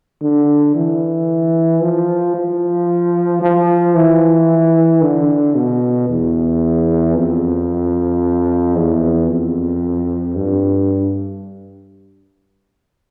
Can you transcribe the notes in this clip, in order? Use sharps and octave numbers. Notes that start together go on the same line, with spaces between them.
D3
E3
F3
F3
F3
E3
D3
B2
E2
F2
E2
F2
G2